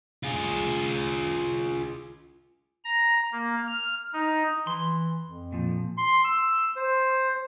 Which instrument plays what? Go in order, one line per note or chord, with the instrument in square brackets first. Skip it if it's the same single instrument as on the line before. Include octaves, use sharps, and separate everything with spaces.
[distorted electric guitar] F4 G#4
[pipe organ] A#5
A#3
F6
D#4
[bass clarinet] E3 [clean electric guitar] C6
[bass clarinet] F2
[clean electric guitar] A#2 F3
[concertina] C6
E6
C5